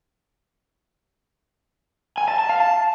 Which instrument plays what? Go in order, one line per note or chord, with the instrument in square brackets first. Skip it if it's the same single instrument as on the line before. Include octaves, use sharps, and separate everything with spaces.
[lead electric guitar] G#5
A5
A5
F5
A5